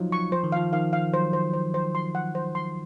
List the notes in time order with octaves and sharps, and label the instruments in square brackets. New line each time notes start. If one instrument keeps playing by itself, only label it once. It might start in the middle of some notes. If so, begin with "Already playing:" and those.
Already playing: [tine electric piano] F3 F#3 D#4 F4
[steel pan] C#6
[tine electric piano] F3 [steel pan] C5
[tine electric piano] D#3
[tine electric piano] F3 [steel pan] F5
[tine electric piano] D#3 [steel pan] F5
[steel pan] F5
[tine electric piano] F#3 [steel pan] C5
[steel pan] C5
C5
C5
C6
F#5
C5
C6